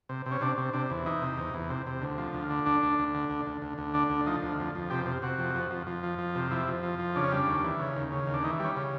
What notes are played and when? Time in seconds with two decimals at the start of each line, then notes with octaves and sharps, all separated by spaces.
0.09 C3
0.26 C3
0.31 C#4
0.41 C3 D4
0.58 C3
0.73 C3 D4
0.90 E2
1.06 E3 D#4
1.22 C3
1.37 E2
1.54 E2
1.70 C3
1.87 C3
2.02 D2
2.18 F3
2.34 D2
2.50 D3
2.66 D2 D4
2.83 D2
2.99 D2
3.15 D3
3.30 D2
3.47 D2
3.62 D2
3.78 D2
3.94 D3 D4
4.10 D2
4.26 F3 D#4
4.43 D2
4.59 F2
4.75 F2
4.90 C3 G4
5.06 C3
5.22 C3 F#4
5.39 F2
5.55 F2
5.70 F2
5.87 F2
6.03 F3
6.18 F2
6.35 C3
6.51 F2 E4
6.68 F2
6.83 F3
6.99 F2
7.15 C#3 D4
7.24 C#4
7.32 G3 D4
7.47 D#2
7.64 E3
7.79 C#3
7.96 D#2
8.12 C#3
8.27 D#2
8.34 D4
8.44 E3 D#4
8.59 G3
8.65 C#4
8.76 C#3